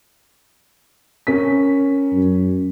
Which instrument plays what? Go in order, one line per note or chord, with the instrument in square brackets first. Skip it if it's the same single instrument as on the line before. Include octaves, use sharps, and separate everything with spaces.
[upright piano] C#4 A#4 B6
[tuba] F#2